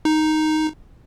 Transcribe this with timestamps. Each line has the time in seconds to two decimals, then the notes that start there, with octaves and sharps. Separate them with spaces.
0.05 D#4